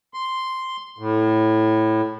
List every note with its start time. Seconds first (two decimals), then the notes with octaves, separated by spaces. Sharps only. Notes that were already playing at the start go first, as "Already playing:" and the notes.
0.14 C6
0.99 A2